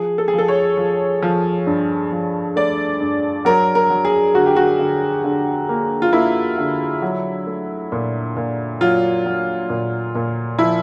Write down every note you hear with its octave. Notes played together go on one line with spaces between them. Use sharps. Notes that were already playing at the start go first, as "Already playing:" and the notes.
Already playing: F3 G#4
A4
G#4
F3
A4
C#5
F3
F3
G2
F3
A3 D5
G2
F#3 A#4
A#4
F#3
G#4
D3 F#4
G4
F#4
D3
D3
A#3
F4
A#3 E4
D3
F#3
A3
A#2
A#2
F#3 F4
F#3
A#2
A#2
F3 E4